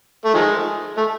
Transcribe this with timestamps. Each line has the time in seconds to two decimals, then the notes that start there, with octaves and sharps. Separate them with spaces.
0.25 A3
0.34 D#3 F3 G#3
0.97 A3